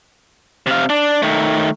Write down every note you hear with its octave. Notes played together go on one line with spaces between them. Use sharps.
C3 F5
D4
D#3 A3